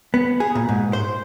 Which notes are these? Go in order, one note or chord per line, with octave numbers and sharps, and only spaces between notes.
B3
G#4
A#2
G#2
C5